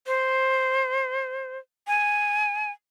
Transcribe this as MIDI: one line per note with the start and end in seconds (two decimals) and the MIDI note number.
0.07 1.58 72
1.87 2.71 80